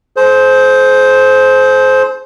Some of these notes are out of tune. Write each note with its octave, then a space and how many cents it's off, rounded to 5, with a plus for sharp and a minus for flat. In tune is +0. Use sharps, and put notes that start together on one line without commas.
G#4 +45 C5 +0